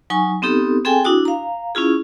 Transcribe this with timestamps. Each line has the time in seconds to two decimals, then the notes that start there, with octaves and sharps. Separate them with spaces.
0.10 F#3 D#4 G#5 C#6
0.42 B3 C4 D#4 G4 A4
0.85 C4 G#4 A4 G5 G#5
1.05 D4 E4 F#4 D#6
1.25 F5 A#5
1.75 C#4 E4 F4 G#4